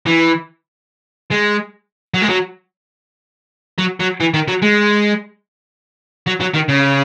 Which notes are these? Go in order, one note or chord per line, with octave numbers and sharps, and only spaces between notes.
E3
G#3
F#3
G#3
F#3
F#3
F#3
E3
D#3
F#3
G#3
F#3
F#3
D#3
C#3